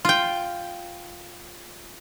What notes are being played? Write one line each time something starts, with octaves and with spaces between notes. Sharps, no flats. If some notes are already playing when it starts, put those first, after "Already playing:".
F4 G5